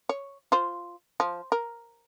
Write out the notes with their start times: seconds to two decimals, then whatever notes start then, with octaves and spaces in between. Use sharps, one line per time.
0.09 C#5
0.52 F4 C5
1.20 F3
1.52 A#4